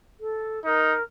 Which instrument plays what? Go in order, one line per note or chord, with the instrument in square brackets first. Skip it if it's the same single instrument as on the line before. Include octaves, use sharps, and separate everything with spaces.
[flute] A4
[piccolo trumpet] D#4 [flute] A#4